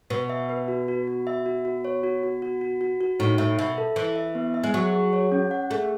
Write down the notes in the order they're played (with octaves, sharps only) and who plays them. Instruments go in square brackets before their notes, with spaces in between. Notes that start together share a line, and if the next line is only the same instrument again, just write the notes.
[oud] B2 [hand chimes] B4
[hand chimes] E5
B4
F#4
F#4
F#4
E5
F#4
F#4
C#5
F#4
F#4
F#4
F#4
F#4
F#4
[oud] A2 [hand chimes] D#4
[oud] A2 [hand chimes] E5
[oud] B2 [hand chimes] E5
[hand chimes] A4
[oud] E3 [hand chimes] E5
[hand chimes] E5
B3
E5
[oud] G#3
[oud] F#3 [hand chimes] G#4
[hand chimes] G#4
C#5
C#4
F#5
[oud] A3 [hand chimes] G#4